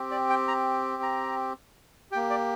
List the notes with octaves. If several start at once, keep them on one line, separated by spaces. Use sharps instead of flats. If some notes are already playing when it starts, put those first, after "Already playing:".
Already playing: C4 G4
D5
G5
A#5
A#5
A#3 G4 G5
D5